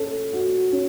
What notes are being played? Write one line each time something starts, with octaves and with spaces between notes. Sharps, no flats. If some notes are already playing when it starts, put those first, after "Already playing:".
Already playing: C#4 A4
F#4
C#4